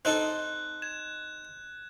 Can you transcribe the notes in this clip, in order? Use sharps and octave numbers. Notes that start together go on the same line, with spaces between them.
C4 D#4 A4 F#6 G6
G#6 E7